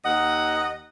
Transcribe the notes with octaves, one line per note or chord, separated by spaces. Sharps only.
D#2 A#4 D#5 F#5